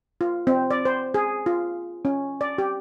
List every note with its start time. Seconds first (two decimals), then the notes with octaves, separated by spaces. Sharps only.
0.21 F4
0.47 C4
0.71 D5
0.85 C5
1.14 G#4
1.46 F4
2.05 C#4
2.41 D5
2.58 G4